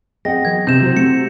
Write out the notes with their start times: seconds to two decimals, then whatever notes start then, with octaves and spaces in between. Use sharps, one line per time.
0.25 C4 G#4 D5 D#5 F#5 G5 A#6
0.45 E3 F#3 B3 G#6
0.67 C3 G6 E7
0.81 C#3 F#3 E4 F#4 C5
0.96 A3 C4 C#7